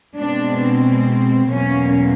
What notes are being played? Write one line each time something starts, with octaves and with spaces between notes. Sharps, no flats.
B2 G#3 C4 D4
E2 B2 F#3 A#3 C#4